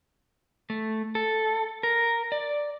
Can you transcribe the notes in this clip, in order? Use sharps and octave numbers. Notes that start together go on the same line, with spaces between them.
A3
A4
A#4
D5